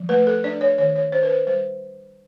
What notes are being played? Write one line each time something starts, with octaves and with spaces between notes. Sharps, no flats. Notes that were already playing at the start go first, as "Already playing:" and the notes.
Already playing: F3
A3 B4
A4
D4 D5
C#5
D#3 C#5
C#5
D4 C5
B4
C5
G3 C5